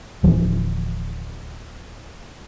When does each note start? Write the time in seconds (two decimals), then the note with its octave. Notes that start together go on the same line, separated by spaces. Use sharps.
0.23 D1 E3 F3